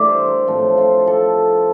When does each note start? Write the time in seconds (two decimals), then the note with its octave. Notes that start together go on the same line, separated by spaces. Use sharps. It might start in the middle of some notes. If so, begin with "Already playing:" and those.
Already playing: A2 E3 G3 D4 D5 E5
0.08 C5
0.28 A#4
0.47 A2 F3 C4 A4
0.78 F4
1.07 A4